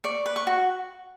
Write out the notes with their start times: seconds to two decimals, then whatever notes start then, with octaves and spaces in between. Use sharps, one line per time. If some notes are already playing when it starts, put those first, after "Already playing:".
0.04 D5 C#6
0.26 B4
0.36 C#6
0.47 F#4